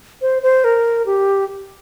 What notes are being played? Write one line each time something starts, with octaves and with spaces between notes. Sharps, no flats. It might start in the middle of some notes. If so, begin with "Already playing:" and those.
C5
C5
A#4
G4